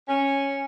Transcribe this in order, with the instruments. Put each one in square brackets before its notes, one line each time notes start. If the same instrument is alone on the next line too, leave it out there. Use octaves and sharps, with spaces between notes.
[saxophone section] C#4